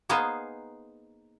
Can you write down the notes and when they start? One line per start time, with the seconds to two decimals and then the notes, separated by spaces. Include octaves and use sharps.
0.09 A#3 B3 D#4 G#4 B4 C5